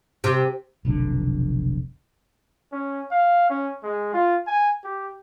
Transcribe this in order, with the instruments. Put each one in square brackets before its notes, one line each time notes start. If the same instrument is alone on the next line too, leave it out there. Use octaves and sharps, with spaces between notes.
[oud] C3
[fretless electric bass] F1 B1 D3
[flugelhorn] C#4
F5
C#4
G#3
F4
G#5
G4